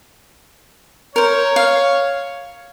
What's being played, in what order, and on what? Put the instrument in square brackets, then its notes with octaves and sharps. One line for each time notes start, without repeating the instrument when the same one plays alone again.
[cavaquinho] A#4 C5 [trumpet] C#5
[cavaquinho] F5